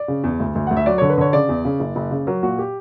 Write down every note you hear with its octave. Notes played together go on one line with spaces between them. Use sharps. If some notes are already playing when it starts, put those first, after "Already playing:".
Already playing: D5
C#3
E2
D2
D2
D2 F#5
E5
F#3 D5
D3 C#5
B4
D3 C#5
C#3 D5
E2
C#3
F#1
F#1
C#3
F#3 A#4
A#2 F#4
G4